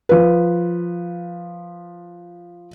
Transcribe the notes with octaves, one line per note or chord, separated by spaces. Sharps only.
F3 B4